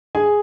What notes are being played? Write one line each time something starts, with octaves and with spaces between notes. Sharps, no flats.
G#4 G#5